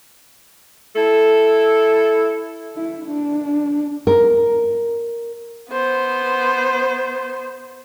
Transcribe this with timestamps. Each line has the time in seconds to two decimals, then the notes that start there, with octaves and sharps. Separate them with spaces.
0.96 E4 A4
2.77 E4
3.06 D4
4.07 A#4
5.70 B3 C5